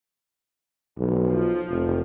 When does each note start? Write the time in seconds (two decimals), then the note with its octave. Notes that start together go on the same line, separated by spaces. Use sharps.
0.97 B1
1.28 F3
1.68 F1